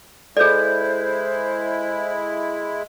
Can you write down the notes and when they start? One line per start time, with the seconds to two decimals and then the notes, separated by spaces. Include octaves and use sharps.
0.37 G#3 E4 G#4 A4 C5 D5 G6